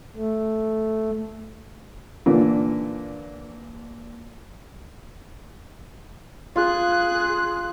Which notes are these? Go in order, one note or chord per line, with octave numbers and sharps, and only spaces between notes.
A3
A#2 D3 E3
F4 G#4 F#6